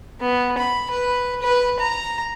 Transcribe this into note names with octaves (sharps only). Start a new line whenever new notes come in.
B3
B5
B4
B4
A#5